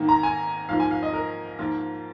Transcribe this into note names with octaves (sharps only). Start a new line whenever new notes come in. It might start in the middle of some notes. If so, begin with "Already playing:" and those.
Already playing: G#2 D#3 A#3
A#5
G#5
G#2 F3 A#3 F5
G#5
F5
D#5
A#4
G#2 F3 A#3 F4